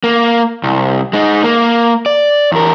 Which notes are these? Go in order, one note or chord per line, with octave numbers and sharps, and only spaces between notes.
A#3
C2
G#3 D#4
A#3
D5
E2 A#4